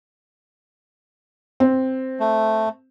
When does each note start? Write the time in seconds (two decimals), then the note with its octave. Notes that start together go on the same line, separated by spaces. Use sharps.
1.60 C4
2.20 A3